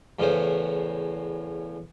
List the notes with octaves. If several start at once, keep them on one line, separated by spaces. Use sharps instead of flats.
E2 A2 C#3 B3 C5